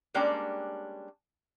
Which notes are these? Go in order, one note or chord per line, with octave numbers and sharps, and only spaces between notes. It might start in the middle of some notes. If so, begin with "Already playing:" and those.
G3 G#3 A#3 C#4 D4 G5